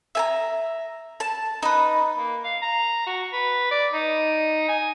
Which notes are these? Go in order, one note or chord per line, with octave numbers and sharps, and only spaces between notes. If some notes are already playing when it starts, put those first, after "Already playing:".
E5 G#5 A#5
A5
D#4 B4
A#3
F5
A#5
F#4
B4
D5
D#4
G#5